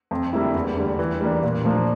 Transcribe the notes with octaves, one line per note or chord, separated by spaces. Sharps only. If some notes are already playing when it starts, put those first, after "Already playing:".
F2
D3 G3 A#3 E4
E2
D3 G3
E3
G3 A#3 D4
A#2
F3 A#3 D4 F4